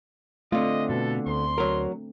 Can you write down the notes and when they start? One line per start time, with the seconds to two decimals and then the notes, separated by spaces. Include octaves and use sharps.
0.52 D3 A3 C4 F4 D#5
0.89 B2 A4
1.27 D2 C6
1.58 F#3 A#4